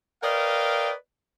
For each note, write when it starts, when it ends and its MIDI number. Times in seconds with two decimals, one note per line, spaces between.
0.22 0.91 70
0.22 0.91 71
0.22 0.91 74
0.22 0.91 75
0.22 0.91 77
0.22 0.91 79